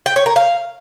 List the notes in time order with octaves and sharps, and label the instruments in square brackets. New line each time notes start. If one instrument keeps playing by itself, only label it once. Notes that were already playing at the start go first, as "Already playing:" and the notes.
[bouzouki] G5
C#5
A#4
F5